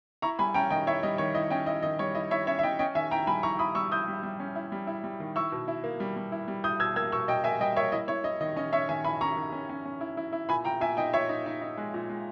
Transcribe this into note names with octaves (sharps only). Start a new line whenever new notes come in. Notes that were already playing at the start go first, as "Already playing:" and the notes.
E4 A#5 C#6
G3 G#5 B5
C#4 G5 A#5
D#3 D#5 G5
E4 C#5 E5
G3 D#5
D#3 C#5
E4 D#5
C#4 D#5 G5
E4 D#5
D#3 D#5
G3 C#5
E4 D#5
E4 C#5 E5
C#4 C#5 E5
E5
E4 D#5 G5
C#4 D#5 G5
D#3 E5 G#5
E4 G5 A#5
G3 G#5 B5
E4 A#5 C#6
E4 B5 D#6
G3 C#6 E6
E4 D#6 G6
G3
G3
C#4
E4
G3
E4
G3
D#3
E4 C#6 E6
B2
E4
A#3
G3
G3
E4
G3
E4 D#6 G6
B2 E6 G#6
A#3 E6 G#6
B2 C#6 E6
B2 D#5 G5
A#3 E5 G#5
G3 D#5 G5
A#3 C#5 E5
E4 D#5
E4 C#5
E4 D#5
D#3 D#5
C#4 D#5
C#4 C#5 E5
D#3 E5 G#5
E4 G#5 B5
C#4 A#5 C#6
D#3
C#4
C#4
C#4
E4
E4
E4
A#2 G#5 B5
A#2 G5 A#5
A#2 E5 G#5
D#4 D#5 G5
A#2 C#5 E5
D#4
D#4
D#4
G#3
A#2
G#3